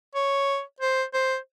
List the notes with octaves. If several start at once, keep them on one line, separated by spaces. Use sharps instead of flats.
C#5
C5
C5